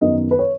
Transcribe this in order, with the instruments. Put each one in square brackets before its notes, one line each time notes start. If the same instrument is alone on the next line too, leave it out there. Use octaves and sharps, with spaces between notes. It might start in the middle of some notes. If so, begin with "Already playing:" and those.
[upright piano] F#2 D#3 B3 D#4 D#5
B4
C#5